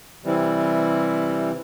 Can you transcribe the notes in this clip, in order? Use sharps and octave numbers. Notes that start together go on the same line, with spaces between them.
C3 E3 G3 C4 E4